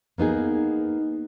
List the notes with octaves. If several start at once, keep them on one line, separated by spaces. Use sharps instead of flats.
A#3 B3 D#4 G#4